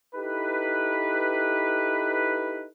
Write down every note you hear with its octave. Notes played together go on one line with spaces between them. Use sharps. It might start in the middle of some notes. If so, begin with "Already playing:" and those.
D#4 E4 G4 A4 B4